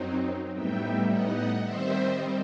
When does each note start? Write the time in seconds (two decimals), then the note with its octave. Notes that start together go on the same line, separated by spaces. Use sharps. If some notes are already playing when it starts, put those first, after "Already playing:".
Already playing: F#2 F#3 C4 D#4
0.53 A2 G3 B3 D#4 E5 G5
1.09 D#5 F#5
1.64 D#3 G3 C4 D#4 C5 E5